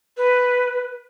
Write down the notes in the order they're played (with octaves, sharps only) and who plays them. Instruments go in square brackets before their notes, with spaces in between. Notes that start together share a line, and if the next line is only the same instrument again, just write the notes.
[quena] B4